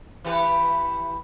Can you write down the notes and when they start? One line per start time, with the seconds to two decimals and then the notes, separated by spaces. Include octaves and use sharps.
0.25 E3 G4 B4